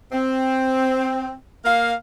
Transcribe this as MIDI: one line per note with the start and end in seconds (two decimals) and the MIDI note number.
0.12 1.31 60
1.64 1.92 58
1.64 1.92 77